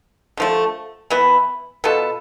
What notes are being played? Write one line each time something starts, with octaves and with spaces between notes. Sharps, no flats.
D3 F3 A3
E3 B3 E4
B2 B3 F4 A4